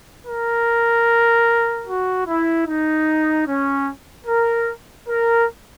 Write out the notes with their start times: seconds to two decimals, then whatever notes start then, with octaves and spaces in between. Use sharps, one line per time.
0.25 A#4
1.86 F#4
2.26 E4
2.66 D#4
3.47 C#4
4.27 A#4
5.07 A#4